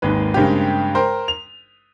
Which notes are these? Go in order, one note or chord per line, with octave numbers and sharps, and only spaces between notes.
G#1 D#2 G#2 G#3 B4
G2 C#3 G#3 A#3 C4 G4
A#4 C5 G5 C6
F7